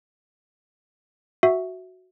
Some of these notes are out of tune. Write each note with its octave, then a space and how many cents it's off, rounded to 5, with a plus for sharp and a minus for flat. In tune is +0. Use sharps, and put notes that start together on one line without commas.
F#4 +0 E5 +0